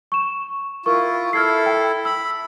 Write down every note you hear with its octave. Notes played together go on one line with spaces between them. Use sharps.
C#6 E7
E4 F4 A#4 C#6
E4 A4 F6 G#6 C7
G5
B5 E6